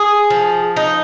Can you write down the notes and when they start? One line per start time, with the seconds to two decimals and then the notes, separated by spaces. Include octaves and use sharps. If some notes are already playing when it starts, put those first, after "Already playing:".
Already playing: G#4
0.30 F3
0.77 D#4